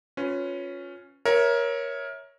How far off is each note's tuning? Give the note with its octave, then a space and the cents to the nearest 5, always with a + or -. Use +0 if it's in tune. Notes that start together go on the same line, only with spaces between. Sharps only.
C#4 +0 F4 +25 B4 +20
A#4 +20 C#5 +0 E5 -20